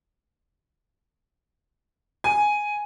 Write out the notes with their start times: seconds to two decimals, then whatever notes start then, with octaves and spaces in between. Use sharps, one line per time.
2.24 G#5